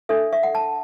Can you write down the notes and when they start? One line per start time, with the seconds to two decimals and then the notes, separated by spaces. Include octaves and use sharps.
0.09 D4 A4 E5
0.33 E5
0.43 F#5
0.55 A5